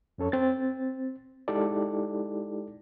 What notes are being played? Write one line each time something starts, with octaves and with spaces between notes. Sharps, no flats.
F2 C#4 A4 C#5
C4 A6
G#3 D#4 E4 G4 A4 D5